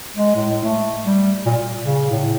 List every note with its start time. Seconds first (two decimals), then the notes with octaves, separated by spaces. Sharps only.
0.17 G#3
0.35 A2
0.64 A3
1.05 G3
1.46 A#2
1.58 A#2
1.83 C#3
2.10 A2